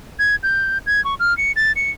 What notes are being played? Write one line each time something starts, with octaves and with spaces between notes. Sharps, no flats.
G#6
G6
G#6
C#6
F6
C#7
A6
C#7